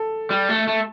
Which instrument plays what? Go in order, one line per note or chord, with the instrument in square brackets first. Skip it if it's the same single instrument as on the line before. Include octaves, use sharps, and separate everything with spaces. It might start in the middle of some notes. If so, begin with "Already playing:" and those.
Already playing: [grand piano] A4
[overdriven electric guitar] G3
A3
A3